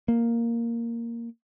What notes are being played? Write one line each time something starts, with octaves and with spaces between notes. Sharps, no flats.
A#3